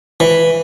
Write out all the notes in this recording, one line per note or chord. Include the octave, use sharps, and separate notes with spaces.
E3